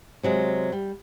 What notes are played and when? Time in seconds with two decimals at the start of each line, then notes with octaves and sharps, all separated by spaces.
0.23 C3 F#3 G#3
0.72 G3